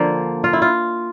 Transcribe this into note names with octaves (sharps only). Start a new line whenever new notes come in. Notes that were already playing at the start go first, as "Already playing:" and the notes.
Already playing: D3 F3 A#3
F4
E4
F4